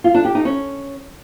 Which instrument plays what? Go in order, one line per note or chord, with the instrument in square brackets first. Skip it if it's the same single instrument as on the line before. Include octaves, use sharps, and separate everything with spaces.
[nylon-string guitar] F4
D4
G4
D#4
C#4